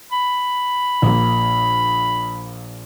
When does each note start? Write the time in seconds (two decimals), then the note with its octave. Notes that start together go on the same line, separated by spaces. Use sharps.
0.12 B5
1.02 A#1 A#3